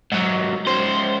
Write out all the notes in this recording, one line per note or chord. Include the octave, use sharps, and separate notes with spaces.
G#2 F#3
C#2 C5